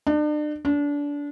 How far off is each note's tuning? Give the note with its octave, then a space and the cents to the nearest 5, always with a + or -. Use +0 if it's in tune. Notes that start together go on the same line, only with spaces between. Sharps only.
D4 +40
D4 -25